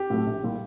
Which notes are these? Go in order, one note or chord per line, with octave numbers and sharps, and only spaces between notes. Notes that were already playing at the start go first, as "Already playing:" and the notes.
Already playing: G4
A2 F#3 A3
A#1
A#2 G3